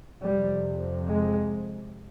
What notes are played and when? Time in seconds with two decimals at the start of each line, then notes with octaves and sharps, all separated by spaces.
0.23 F2 C3 G3
1.07 G#3